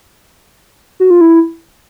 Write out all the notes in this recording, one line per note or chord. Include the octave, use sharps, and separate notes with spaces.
F#4
F4
E4